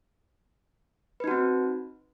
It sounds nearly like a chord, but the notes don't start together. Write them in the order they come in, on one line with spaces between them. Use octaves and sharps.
B4 D#4 F#4 C4